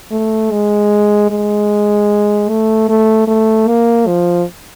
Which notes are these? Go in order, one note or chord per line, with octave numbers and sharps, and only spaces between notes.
A3
G#3
G#3
A3
A3
A3
A#3
F3